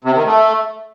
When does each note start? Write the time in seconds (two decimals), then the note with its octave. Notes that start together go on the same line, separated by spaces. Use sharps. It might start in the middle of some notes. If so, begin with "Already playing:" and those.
0.04 C3
0.15 D#3
0.26 A3